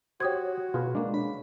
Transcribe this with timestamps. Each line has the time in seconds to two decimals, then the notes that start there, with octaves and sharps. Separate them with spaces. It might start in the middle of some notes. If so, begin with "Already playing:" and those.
0.20 F#4 G4 C5 C#5 D#6 G#6
0.74 B2 F4 G#4 B4
0.95 G#3 A#3 D4
1.14 C#3 B5